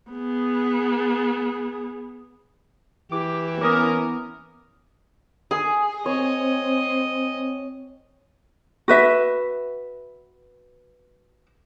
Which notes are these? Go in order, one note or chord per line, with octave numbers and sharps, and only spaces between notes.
B3 G#4
E3 G4 D6
B3 C#4 A#4 D6 D#6
G#4 G#5
C4 C#5 D#5
F#4 B4 E5